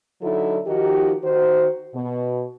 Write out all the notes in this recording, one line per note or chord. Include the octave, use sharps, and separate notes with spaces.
D3 F#3 D#4 E4 A4
D#3 F3 D#4 F#4 G4
D#3 F#4 C5
B2